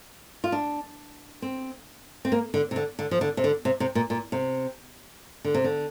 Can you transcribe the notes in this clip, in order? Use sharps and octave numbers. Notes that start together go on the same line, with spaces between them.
F4
D4
C4
C4
A#3
D3
C3
D3
D3
F3
D3
C3
D3
C3
C3
A#2
A#2
C3
D3
C3
D3